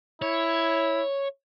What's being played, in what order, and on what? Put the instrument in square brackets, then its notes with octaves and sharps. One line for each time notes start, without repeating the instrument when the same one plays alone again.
[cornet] E4 [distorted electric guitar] C#5